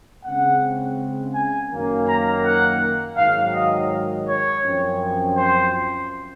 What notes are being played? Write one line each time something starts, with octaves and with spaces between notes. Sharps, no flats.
C#3 G#3 C4 F#5
G#5
F#2 D#3 F#3 A#3
A#5
F#5
G#2 D#3 F#3 F5
D#5
C#5
F#2 F3 C4
C5